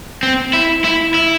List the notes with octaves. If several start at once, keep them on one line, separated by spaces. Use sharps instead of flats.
C4
E4
E4
E4